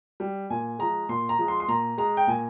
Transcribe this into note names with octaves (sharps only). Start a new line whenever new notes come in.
G3
A#2 G#5
F3 G#3 A#5
A#2 C6
A#5
F3 G#3
C6
C6
A#2 A#5
G#3 A#5
G5
A#2 G#5